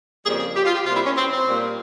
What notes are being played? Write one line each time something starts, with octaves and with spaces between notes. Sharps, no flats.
F2 C#3 G3 A#3 G#4
G#4
G4
F4
G4
C3 G3 A#3 F4
E4
C#4
C4
C4
A#2 G3 A#3